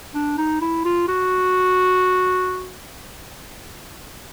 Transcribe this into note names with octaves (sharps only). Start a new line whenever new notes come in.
D4
D#4
E4
F4
F#4